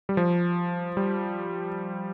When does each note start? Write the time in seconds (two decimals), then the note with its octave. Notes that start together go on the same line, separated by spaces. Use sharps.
0.09 G3
0.17 F3
0.97 G3